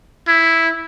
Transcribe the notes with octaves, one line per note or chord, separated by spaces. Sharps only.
E4